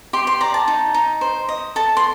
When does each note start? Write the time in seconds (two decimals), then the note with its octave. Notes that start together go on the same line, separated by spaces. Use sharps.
0.13 G4 C6
0.27 C6
0.41 D5 A#5
0.54 A5
0.68 D#4
0.94 D#4
1.21 C5
1.49 D#5
1.76 A4 A5
1.97 C6